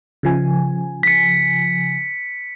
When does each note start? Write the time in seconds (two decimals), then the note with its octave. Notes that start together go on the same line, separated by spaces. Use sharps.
0.23 C#3 F3 G#5
1.03 B6 C#7